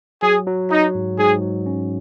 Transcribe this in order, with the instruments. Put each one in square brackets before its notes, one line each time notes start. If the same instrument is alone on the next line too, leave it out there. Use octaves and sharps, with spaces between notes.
[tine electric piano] F#3 [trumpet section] G#4
[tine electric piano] F#3
[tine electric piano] F#3 [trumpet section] D#4
[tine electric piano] G#2
[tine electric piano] G#2 [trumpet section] G#4
[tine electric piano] F#3
C#4